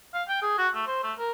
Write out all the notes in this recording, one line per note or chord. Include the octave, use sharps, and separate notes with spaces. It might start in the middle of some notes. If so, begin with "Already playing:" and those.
F5
G5
G#4
F#4
A3
C5
A3
A#4